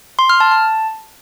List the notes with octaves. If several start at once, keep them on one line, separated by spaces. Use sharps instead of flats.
C6
F6
A5
A5